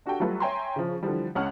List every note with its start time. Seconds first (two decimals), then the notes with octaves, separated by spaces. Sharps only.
0.06 D4 F#4 G4 A4 G5
0.20 F#3 G3 A3 F4 A4 B4
0.40 C#5 E5 G5 G#5 A#5 C6
0.76 C#3 F3
1.03 D3 E3 F3 G3
1.35 C#2 C#4 F#5 A5 F6